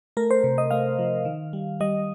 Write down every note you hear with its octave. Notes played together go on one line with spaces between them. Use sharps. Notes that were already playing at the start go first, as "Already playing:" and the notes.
A3 A#4
C5
C3
D#5
A3 F5
F3
D#3
G3
G3 D#5